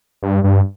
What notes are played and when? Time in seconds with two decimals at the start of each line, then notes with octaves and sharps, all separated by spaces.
0.23 G2
0.44 G2